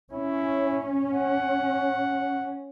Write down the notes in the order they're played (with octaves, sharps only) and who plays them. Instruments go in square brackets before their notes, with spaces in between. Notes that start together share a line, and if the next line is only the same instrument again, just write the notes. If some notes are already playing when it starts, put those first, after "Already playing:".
[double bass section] C#4 [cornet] E4
[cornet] F#5